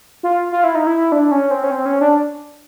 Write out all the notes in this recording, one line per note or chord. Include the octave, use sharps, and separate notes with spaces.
F4
F4
E4
D#4
E4
D4
C#4
C4
C#4
C4
C#4
D4